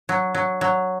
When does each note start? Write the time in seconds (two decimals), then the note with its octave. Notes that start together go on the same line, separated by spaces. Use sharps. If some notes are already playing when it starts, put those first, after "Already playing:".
0.09 F#3
0.35 F#3
0.61 F#3